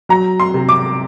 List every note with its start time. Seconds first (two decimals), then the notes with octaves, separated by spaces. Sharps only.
0.09 F#3 A#5
0.40 C6
0.54 C3
0.69 D6